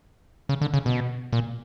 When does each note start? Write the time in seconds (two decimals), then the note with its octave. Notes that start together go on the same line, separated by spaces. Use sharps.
0.49 C#3
0.61 D3
0.74 C#3
0.86 B2
1.33 A#2